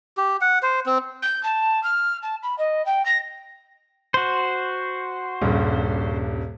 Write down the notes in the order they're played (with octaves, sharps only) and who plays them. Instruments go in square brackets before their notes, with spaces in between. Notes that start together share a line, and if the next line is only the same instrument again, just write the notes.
[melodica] G4
F#5
C5
C4
[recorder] G6
A5
F6
A5
B5
D#5
G5
A#6
[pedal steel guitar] F#4 C5
[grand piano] D#1 G2 C#3